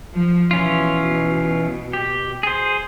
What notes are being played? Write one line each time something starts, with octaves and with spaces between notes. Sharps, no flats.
F3
B2 E3 C#4 F4
G4
G#4 C5